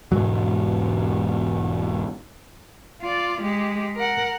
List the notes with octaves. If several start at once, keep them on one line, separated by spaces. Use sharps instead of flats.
E1 C#2 G#2 F#3
F4 D5
G#3 G4
A#4 F#5